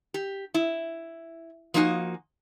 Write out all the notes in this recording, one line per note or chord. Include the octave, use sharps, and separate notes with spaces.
G4
E4
F3 A#3 D#4 F#4 G#5